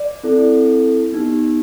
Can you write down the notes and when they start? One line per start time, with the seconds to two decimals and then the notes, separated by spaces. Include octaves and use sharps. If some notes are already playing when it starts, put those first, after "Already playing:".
Already playing: D5
0.23 C4 E4 A4
1.12 B3 D#4 G4